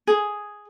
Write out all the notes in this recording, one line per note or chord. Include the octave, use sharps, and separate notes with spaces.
G#4